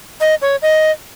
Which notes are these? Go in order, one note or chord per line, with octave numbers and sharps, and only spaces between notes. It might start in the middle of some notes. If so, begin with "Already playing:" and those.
D#5
C#5
D#5